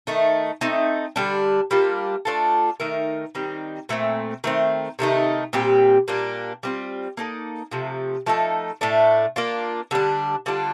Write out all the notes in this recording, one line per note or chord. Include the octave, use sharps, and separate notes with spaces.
D#3 A3 D#4
A3 C4 D#4
D3 G3 D4
G3 A#3 D4 F4
A3 D4 F4 A4
D#3 A3 D#4 A#4
D#3 G3 C4 D#4
A#2 A3 C4
D#3 A3 C4
C3 D#3 A3 D#4
A#2 G3 C4 G4
A#2 G3 A#3 D4
G3 C4 F4
A#3 D#4 A4 D5
C3 F3 A3
F3 A3 D#4 A4
A2 A3 D4
A#3 D4 F4
D3 G3 D4
D3 G3 D4 F4